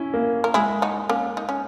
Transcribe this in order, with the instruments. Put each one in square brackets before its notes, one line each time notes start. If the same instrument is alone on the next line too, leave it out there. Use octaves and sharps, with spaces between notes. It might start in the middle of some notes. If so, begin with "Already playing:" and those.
Already playing: [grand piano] C#4 E4
A#3
[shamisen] A#4
[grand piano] G#3 [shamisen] E4 G#4
[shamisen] D#4 F#4
A#3 C#4
D#4
C#4